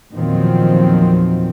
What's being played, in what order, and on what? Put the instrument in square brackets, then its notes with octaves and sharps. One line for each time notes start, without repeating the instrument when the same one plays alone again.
[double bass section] E2 A#2 D#3 F3 F#3 C4